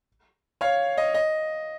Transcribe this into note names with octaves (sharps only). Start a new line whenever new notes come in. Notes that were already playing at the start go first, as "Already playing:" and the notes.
C#5 F5
D#5
D#5